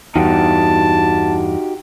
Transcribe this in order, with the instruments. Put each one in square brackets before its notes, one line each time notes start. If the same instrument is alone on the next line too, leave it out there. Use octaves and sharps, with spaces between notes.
[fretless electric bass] E2 G2 [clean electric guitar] D#4 F#4 G4 [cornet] A5